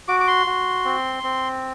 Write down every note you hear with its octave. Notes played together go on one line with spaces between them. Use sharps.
F#4 D6
D6
C6
F#4
C4
C4